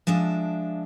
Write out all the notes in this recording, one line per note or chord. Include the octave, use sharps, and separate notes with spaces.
F3 G#3 D4 E5